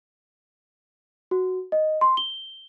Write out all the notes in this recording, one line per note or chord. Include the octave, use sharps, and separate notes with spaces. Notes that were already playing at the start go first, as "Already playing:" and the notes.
F#4
D#5
C6
G7